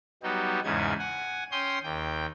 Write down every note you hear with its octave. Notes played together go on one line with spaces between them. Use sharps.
F#3 G3 B3 D#4 G4
E2 G#2 C#3 D#4 G#6
F#5 G#5
C#4 G5 C6 D#6 G6
D#2 G5